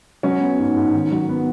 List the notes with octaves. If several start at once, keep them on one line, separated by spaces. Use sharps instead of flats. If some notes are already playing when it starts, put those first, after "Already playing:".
F#3 C#4
B3
G#2
G#2
D#3
F#3
B3